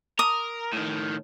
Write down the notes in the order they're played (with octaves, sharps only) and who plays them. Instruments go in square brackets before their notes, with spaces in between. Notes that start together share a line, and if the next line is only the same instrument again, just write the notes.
[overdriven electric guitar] A#4 [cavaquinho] D#6
[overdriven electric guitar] A2 D#3